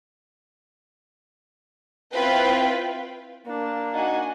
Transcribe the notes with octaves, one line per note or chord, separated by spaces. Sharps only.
C4 E4 F4 B4 G5
A#3 D4
D#4 F#4 F#5 G#5